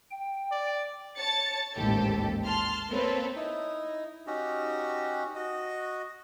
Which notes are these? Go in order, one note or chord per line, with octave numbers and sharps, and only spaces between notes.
G5
D5
C#5 A5 A6 C#7
A1 D#2 G#2 G4 A4
A5 C6 F6
A#3 C4 A4 B4 C#5
D#4 E4
C#4 D#4 F#4 G4
F#4 D#5